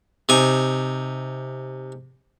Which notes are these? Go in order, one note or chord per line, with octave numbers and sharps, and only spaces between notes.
C3 D#4 G#5